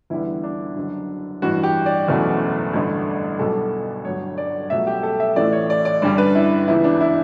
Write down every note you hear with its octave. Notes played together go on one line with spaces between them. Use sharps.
E2 D3 G3 B3 E4
D4
F#1 F#2 D3
A1 G2 E3 F#4
G4
D5
F#1 E2 B2 A3 C#4
A1 G2 D3 A3
B1 B2 G3 A4
G1 G2 F#3 C#5
D5
C#2 B2 F#3 A3 E5
G4
A4
E5
A1 A2 E3 A3 D5
C#5
D5
D5
G2 D3 G3 C#4 D5
B4
E4
C#2 C#3 E3 B3 E4
D4
E4